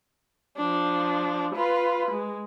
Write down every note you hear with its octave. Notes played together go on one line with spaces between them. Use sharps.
F3 D4
F4 B4
G#3